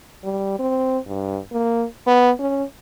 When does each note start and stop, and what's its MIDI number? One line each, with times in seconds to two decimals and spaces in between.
0.24 0.57 55
0.59 0.99 60
1.07 1.38 43
1.52 1.85 58
2.07 2.31 59
2.40 2.64 61